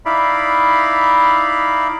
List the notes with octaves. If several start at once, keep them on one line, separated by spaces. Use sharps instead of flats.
D#4 E4 D5 E5 F5 B5